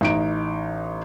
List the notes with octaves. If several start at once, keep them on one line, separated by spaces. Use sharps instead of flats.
A1 D#4 D7